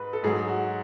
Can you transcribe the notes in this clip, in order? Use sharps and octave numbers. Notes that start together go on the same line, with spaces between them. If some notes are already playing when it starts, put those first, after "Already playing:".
Already playing: G#2 B4
A4
G#2 F#3 G#4
F#4